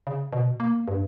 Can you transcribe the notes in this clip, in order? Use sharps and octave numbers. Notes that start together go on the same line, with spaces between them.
C#3
B2
A#3
G2